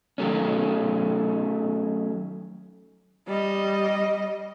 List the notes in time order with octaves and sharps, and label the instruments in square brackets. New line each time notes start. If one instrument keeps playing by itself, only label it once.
[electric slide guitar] D#3 F#3 A3 C#4
[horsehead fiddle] G3 D#5